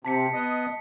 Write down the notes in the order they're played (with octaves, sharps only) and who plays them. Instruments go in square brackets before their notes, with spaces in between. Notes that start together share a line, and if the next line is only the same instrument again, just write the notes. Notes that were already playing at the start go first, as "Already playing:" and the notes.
[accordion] C3 [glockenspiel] A5 B6 C#7
[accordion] B3 D#5